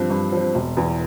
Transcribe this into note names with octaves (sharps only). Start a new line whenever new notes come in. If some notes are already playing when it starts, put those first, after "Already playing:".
Already playing: G2 F3 C4
G2
F3 C4
E1
E2 E3